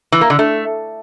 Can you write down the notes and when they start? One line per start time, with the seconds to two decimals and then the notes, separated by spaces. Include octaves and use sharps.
0.12 E3
0.21 A#3
0.30 D3
0.39 A3